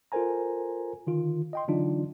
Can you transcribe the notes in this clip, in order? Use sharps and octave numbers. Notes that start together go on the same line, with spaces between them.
F4 A4 A#4 C5 G#5 A#5
D3 D#3 F4
D#5 G5 C6
D3 E3 F#3 D4 D#4 F4